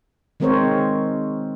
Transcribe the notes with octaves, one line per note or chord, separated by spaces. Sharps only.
D#3 G#3 C4 A#4 C5 C#5